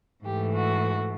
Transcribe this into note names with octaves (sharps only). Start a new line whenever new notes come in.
G#2 E3 A3 G4
F#4